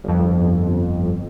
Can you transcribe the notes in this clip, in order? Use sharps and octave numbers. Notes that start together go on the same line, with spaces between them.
G1 F2